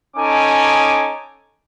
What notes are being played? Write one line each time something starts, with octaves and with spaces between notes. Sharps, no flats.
C#4 D#4 A4 G#5 D6 D#6